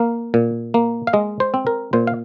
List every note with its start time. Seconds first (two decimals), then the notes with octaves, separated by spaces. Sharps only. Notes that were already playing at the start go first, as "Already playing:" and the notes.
Already playing: A#3 F5
0.34 A#2
0.74 A#3
1.07 F5
1.13 G#3 D#5
1.40 C5
1.54 C4
1.67 A#4
1.93 A#2 C5
2.07 F5